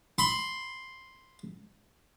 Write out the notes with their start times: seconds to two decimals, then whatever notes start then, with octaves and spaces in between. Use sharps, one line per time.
0.18 B5 C6